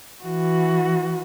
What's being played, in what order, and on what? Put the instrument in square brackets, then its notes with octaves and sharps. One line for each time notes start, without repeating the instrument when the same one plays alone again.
[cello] E3 F#4